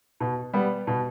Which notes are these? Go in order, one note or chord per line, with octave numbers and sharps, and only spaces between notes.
B2
G3 B3
B2